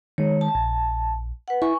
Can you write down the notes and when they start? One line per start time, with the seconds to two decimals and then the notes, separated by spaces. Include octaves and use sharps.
0.18 D#3 G#3 C#5
0.41 A5
0.55 A#1
1.48 B4 F#5
1.62 E4 G#5 C#6